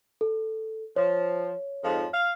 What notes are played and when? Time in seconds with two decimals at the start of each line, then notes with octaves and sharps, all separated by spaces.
0.21 A4
0.96 F3 C#5
1.82 F2 G#2 F3
2.12 F5